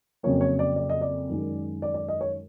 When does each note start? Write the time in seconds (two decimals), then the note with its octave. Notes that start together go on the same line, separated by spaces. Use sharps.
0.23 F2 C#3 F#3 A#3 C#5
0.41 C#5
0.59 D5
0.76 D5
0.89 D#5
1.01 D5
1.29 F#2 D#3 G#3
1.82 D5
1.94 D5
2.08 D#5
2.21 C#5